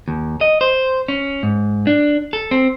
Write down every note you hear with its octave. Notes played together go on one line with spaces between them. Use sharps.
D#2
D#5
C5
C#4
G#2
D4
A4
C4